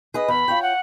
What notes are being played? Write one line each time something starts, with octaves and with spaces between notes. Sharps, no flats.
G#4 B4 D#5
E2 B5
F4 C#5 G5
F#5